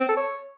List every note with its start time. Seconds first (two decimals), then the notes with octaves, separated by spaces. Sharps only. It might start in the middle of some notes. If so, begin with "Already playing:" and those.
0.01 C4
0.09 A4
0.17 C#5